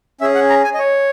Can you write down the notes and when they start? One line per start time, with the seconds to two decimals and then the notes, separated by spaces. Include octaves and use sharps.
0.21 C#4 G#4 E5
0.35 F#5
0.50 A#5
0.64 G#5
0.74 D#5
0.79 C#5